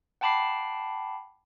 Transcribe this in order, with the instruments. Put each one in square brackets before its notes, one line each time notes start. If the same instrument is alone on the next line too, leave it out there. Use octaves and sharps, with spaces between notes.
[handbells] F#5 G5 A5 B5 D6 C7